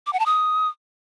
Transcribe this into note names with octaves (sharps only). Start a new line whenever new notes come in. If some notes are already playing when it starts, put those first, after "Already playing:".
D6
F#5
A5
D#6